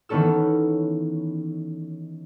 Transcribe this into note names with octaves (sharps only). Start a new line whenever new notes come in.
D#3 E3 B3 C#4 A4 E6